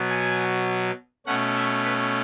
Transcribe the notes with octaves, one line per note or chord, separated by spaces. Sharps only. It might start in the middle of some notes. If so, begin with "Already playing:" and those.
Already playing: B2 F#3 B3
G#5
B2 A3 C#4 F#5
E5
B4